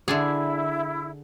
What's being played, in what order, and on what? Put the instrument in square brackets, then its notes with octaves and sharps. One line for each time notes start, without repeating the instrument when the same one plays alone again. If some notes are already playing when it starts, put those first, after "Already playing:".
[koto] D3 D4 G#4 [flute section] E4